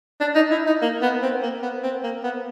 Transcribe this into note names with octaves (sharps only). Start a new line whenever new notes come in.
D4
D#4
E4
D#4
A#3
B3
C4
A#3
B3
C4
A#3
B3